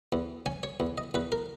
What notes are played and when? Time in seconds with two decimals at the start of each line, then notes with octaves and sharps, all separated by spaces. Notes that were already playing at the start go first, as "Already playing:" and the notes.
0.12 E2
0.46 C#4 G#5
0.63 C#5
0.80 E2
0.98 D#5
1.14 E2 B4
1.32 A#4